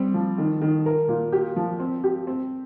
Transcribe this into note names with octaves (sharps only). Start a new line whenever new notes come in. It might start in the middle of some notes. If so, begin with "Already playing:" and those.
Already playing: G3 C4
F3
D#3
D#3
A#4
A#2
G4
F3
C4
G4
C4